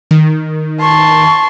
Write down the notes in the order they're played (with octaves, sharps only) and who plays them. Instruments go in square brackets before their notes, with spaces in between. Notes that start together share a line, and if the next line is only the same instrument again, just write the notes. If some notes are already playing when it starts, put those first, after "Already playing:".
[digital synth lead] D#3
[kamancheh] A5 C6 [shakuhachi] C#6